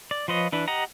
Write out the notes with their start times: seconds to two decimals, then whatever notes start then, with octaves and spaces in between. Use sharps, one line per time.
0.11 D5
0.28 F3 F4 B4 C#5 D#5
0.52 E3 D4 B4
0.68 G4 D#5 F#5 A#5